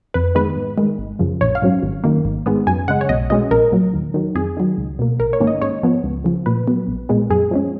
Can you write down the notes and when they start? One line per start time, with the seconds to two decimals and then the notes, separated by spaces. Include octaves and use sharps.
0.14 F2 B4
0.35 D#3 G#3 B3 B4
0.56 G#2
0.78 D#3 G#3
0.99 G#1
1.19 F#2 C#3 F3
1.41 A#1 C#5
1.55 F5
1.62 G#2 F#3 C#4
1.83 G#1
2.04 F#2 D#3 A#3
2.25 G#1
2.46 G#2 D#3 G#3 B3
2.67 F#2 G#5
2.88 C#3 G#3 F#5
3.01 C#5
3.09 B1 D#5
3.30 B2 G#3 C#4 D#5
3.51 A#1 A#4
3.72 A#2 F#3
3.94 D#2
4.14 D#3 F#3
4.35 F2 G#4
4.57 D#3 F#3
4.77 C#2
4.99 B2 A#3
5.20 A#1 A#4
5.33 C#5
5.40 G#2 D#3 A#3 C#4
5.47 D#5
5.62 G#2 C#5
5.83 F3 B3
6.04 C#2
6.24 C#3 F3
6.46 A#2 B4
6.67 F#3 B3
6.88 A#1
7.09 A#2 G#3 B3
7.30 F#2 G#4
7.51 F3 G#3 C#4